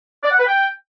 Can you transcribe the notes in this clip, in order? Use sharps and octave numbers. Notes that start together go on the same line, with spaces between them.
D5
F#5
B4
G5